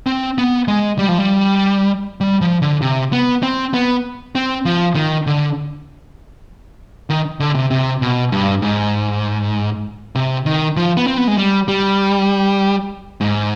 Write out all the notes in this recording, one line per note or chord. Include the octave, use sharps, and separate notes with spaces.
C4
B3
G#3
G3
F3
G3
G3
F3
D3
C3
B3
C4
B3
C4
F3
D#3
D3
D#3
D3
C3
C3
B2
G2
G#2
C3
D#3
F3
B3
C4
B3
G#3
G3
G3
G#2